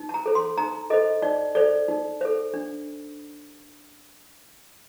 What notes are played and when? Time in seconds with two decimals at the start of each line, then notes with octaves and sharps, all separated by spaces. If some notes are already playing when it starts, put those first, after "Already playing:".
Already playing: D#4
0.09 A5
0.14 A#5
0.26 A4 C5
0.35 C6
0.57 D#4 A#5
0.90 A4 C5 D#5
1.22 D#4 D5
1.55 A4 C5 D5
1.88 D#4
2.21 A4 C5
2.54 D4